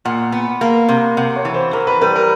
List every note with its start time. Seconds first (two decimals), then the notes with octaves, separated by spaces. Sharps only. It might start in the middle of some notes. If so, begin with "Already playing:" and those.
0.05 A#2 F#5
0.32 B3
0.61 A#3
0.89 C3
1.17 C3 F#5
1.36 C#5
1.45 E3
1.54 C5
1.73 E3 A#4
1.87 B4
2.02 G3 B4
2.16 A#4